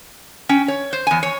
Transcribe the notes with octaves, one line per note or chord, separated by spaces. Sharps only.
C#4 G5
C#5
C5
E2 G#5
C#5